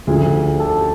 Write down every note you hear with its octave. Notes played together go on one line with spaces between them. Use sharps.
D2 D3 F3 G#4
G#4
G4 A4